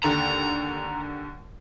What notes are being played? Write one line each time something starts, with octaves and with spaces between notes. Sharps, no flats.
D#2 D3 A#5